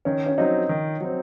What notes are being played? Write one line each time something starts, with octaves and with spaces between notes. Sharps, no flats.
D#3 C#4
C#4
F#3 C4 D#4
D#3
F#3 C4